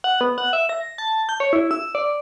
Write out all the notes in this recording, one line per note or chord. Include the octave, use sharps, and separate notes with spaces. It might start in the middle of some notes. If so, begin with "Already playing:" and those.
F#5
B3
F#5
E5
A#6
A5
G6
C#5
E4
E6
D5